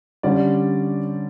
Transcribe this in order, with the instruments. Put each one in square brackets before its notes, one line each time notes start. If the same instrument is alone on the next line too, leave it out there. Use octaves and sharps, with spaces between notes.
[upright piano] D3 G3 C#4 G4 D5